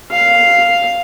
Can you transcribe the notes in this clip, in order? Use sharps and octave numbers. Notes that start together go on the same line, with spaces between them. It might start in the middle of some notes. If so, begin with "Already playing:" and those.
F5